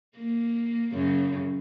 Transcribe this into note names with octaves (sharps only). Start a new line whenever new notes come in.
A#3
F#2 C#3